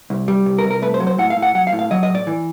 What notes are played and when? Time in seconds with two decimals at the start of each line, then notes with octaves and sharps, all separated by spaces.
0.10 C2
0.28 G3
0.46 C2
0.59 A#4
0.64 C2
0.71 A#4
0.82 A3 B4
0.94 C5
1.00 F#3
1.07 C5
1.18 A2 F#5
1.30 F5
1.37 A2
1.42 F#5
1.55 F#3 F#5
1.67 F5
1.72 A2
1.79 F5
1.91 F#3 D#5
2.03 D#5
2.09 A2
2.15 D5
2.27 E3